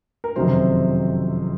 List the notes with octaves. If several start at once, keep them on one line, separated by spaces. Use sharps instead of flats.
A#4
F#1 F2 C3 D#3 F#3 C5